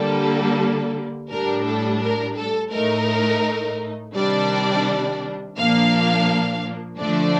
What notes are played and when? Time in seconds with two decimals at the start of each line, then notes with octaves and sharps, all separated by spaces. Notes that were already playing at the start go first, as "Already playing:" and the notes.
Already playing: D3 G3 A#3 A4
1.29 A2 G3 D4 A#4
1.65 A4
2.01 A#4
2.36 A4
2.72 A2 A3 D#4 A#4
4.15 C3 D#3 G3 D4 D5
5.58 A#2 F3 A#3 D4 F5
7.00 D3 F3 A3 D4 D5